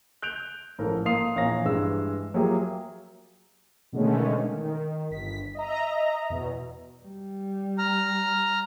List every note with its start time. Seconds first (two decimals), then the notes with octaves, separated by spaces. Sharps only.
0.22 F#6 G6 D7 F7
0.79 A1 G#2 F3 A4 A#4
1.05 A#3 F5 C6 D#6 C7 F7
1.35 A#1 E2 C#5 F5 A#5 A#6
1.65 G2 E3 G#3 E6
2.34 F#3 A#3 F4 G4 G#4 E5
3.93 B2 D3 D#3 G#3 A3 C#4
4.53 D#3
5.10 G1 B6
5.55 D#5 E5 A#5
6.30 E2 B2
7.03 G3
7.78 A#5 F6